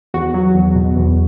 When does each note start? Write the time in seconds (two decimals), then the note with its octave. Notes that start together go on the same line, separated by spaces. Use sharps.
0.14 E2 F#4
0.34 F#3
0.55 E2
0.75 B2
0.96 E2